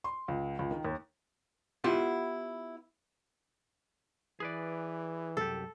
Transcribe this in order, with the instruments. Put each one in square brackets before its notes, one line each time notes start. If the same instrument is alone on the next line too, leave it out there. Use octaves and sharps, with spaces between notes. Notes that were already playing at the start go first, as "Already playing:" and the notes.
[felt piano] C6
C#2
C#2
D#3
D#2
[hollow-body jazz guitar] B3 E4 F4 G4 F#5
[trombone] E3 [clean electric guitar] G#4 B4 D5
[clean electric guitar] C2 F#2 G4 [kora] A4